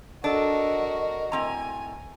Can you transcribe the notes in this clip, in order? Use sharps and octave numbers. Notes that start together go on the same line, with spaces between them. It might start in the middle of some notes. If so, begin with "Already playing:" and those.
D4 F#4 A4 A#4 D#5
A2 C4 G#5 A#5